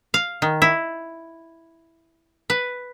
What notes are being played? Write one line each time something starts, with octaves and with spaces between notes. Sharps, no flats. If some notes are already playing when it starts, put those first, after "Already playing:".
F5
D#3
E4
B4